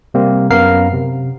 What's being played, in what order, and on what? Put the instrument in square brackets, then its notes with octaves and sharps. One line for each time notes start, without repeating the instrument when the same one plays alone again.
[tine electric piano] C3 G3 A#3 C4
F#2 B3 A#4 F5 C7
C3